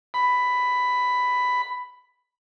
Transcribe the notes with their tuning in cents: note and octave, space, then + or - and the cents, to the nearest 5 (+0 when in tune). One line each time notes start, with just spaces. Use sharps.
B5 +10